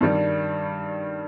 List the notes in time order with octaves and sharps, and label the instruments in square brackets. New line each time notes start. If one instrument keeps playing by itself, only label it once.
[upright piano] G2 D#3 G3